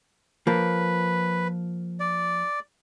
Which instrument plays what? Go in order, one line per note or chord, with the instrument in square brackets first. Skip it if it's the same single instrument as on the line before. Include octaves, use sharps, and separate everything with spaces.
[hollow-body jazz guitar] F3 A#3 [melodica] B4
[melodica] D5